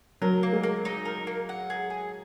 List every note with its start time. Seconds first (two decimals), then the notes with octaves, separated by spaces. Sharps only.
0.22 F#3 A#4
0.43 A#3
0.53 G#3
0.63 A#3
0.85 D#4
1.05 A#4
1.27 A#3
1.49 F#5
1.70 G#4
1.90 G#4